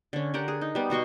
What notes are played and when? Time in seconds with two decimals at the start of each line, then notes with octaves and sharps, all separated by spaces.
0.13 D3 C#4
0.34 D3 G4 A#4 F#5
0.48 G#4
0.61 D#4
0.75 G3 B3
0.90 B2 F#4 C6 C#6